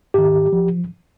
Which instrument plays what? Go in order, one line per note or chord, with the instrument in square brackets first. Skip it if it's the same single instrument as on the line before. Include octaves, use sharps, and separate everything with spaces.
[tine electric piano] G#2 D#3 G4
F3